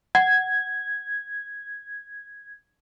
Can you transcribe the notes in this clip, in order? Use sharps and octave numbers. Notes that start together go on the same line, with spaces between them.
F#5 G#6